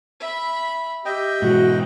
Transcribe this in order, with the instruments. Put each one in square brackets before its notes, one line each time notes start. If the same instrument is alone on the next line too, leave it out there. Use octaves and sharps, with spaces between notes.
[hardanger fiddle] E5 B5
[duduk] G4 [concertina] D#5 G5 [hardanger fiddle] E5
[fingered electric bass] G#2 B2 E3 [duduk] F#4